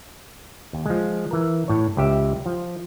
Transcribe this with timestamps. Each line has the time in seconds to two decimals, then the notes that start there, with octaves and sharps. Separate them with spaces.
0.73 D#2
0.86 F3 G#3
1.31 E3 A#4
1.68 A2 C#5
1.97 C#2 G4 E5
2.46 F3